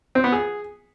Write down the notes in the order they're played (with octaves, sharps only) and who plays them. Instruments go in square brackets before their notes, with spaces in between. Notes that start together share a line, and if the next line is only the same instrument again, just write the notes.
[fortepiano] C4
B3
G#4